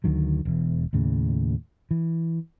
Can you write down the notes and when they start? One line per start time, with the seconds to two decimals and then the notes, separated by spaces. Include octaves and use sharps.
0.04 D2 D3 D#3 F#3
0.45 E1 E2
0.93 D#2 A2 C#3
1.91 E3